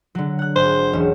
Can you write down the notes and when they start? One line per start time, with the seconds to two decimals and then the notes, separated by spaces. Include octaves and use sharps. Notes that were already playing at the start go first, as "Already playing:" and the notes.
0.15 D3 F#3
0.39 F#5 F#6
0.56 G#1 C5
0.93 E1 C#4 E7